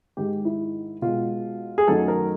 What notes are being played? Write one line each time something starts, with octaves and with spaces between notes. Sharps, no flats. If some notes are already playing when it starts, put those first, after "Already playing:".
G#2 D#3 G#3 G4
E4
B2 G#3 F4
G#4
F#2 D#3 F#3 A3 A4
A#4